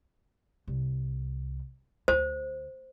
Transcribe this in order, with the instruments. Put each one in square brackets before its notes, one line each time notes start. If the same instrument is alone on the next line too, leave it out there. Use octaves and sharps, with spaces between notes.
[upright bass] C2
[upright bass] D2 [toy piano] C5